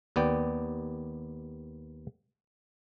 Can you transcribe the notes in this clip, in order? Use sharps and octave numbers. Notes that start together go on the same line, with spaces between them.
D#2 B3 D5 G5